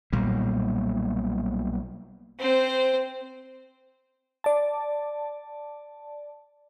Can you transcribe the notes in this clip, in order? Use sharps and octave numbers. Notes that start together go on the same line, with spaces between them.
B1 A#2 G3 A#3
C4 C5
D5 A5